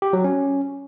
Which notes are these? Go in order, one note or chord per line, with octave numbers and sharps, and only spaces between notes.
G4
F#3
C#4